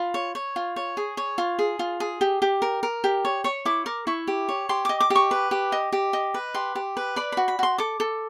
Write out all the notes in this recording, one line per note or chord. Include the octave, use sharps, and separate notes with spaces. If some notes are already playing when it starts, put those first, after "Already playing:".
Already playing: F4 B5
C#5
C#5
F4
C#5
G#4
C#5
F4
G#4
F4
G#4
G4
G4
A#4
A#4
G4
C#5
C#5 C#6
E4 D6
A#4 D6
E4 C#6
G4
C#5
G4 C6
D#5 D6
D6
G4
C#6
B4
G4
D#5
G4
D#5
B4
G4 C6
G4
B4
D5 B5
F#4 B5
B5
F#4 C6
A4 D6
A4